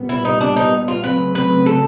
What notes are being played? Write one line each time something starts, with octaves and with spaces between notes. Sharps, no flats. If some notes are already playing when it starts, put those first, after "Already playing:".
Already playing: A#2 G3 B3
E4
D#4
D4
D#4
F4
C#3 F#3 A3 C4 B4
B4
A4